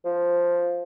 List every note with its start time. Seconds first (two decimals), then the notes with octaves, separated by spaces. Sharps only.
0.05 F3